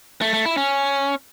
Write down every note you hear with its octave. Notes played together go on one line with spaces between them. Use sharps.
A3
A3
E4
C#4